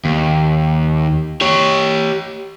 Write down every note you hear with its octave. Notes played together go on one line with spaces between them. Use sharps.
D#2
G4 C#5